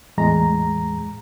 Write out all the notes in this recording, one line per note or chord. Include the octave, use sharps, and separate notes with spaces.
E2 A2 G#3 A#5